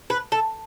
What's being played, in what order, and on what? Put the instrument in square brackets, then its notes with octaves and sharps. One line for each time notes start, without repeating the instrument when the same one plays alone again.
[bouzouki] B4
A4